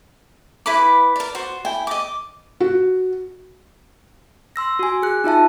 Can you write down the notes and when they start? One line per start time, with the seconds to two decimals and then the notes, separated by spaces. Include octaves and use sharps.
0.66 E4 B4 B5 D6
1.16 A#4 D5
1.35 F#4 C5
1.65 E4 G5 G#5
1.87 D#5 D6
2.60 F#4
4.56 C6 E6 A#6
4.79 F#4 G#5
5.03 G#4 F#6
5.24 D#4 F4 E5 A5